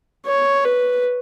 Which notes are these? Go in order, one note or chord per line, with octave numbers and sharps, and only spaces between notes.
C#5
B4